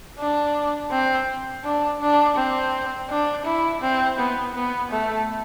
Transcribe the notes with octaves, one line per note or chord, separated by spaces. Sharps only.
D4
C4
D4
D4
C4
D4
E4
C4
B3
B3
A3